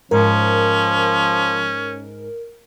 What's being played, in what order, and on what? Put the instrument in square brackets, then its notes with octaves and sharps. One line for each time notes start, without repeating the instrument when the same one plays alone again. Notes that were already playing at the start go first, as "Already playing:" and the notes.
[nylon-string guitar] G#2 [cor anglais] F3 [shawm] C#4 [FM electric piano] A#4